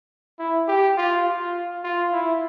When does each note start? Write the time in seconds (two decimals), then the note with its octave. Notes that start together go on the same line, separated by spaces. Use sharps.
0.39 E4
0.68 G4
0.97 F4
1.26 F4
1.84 F4
2.12 E4